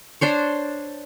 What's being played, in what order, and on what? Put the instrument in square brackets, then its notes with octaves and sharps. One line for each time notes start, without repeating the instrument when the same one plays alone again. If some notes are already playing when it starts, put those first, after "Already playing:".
[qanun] D4 C5 C#5